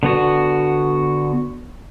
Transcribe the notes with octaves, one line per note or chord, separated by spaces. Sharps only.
D3 B3 F#4